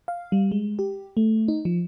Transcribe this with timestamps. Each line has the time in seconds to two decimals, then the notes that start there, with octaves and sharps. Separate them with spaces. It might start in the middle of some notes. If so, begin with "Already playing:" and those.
0.08 F5
0.32 G3
0.52 G#3
0.79 G4
1.17 A3
1.48 D#4
1.65 F3